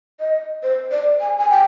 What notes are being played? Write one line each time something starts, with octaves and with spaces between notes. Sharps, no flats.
D#5
C5
D5
G#5
G#5
G5